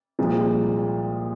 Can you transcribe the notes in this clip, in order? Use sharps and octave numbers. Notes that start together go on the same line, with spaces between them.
C2 A#2 F3 G#3